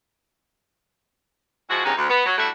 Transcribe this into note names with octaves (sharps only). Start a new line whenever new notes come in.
F3 G#3 E4 F#4
E2 G#2 C3 C#4 D#4
D2
B3
F#3
G3 A3 D4 E4 F#4 E5